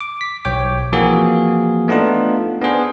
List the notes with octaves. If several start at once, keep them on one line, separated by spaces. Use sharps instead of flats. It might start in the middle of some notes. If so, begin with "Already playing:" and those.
D6
B6
B1 C#5 G5 D6
E3 F3 A#3 C4 F#4 G#4
A3 B3 D4 D#4 F4
B3 D4 G#4 C5